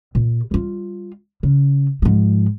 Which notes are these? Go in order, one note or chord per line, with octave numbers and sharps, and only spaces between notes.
A#2
G3 F4
C#3
G#2 F3